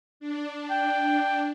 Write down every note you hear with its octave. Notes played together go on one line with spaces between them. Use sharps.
D4
G5